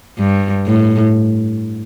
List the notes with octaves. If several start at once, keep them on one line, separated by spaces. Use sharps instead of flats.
G2
A2